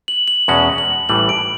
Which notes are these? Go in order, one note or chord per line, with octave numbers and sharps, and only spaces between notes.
F#7
F#7
E2 B2 G#3 C#4 F#4 F#7
F#7
A1 A2 E3 G3 F#7
D7